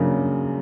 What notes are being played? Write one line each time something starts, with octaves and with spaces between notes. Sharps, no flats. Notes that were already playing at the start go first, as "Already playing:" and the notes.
Already playing: F#2 C#3 F#3 A#3 D4